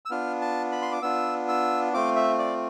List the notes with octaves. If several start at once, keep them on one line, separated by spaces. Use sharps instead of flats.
E6
B3 D4 F4 F6
A5
B5
C6
D6
B3 D4 F4 E6
E6
A3 C4 F4 D6
E5
D5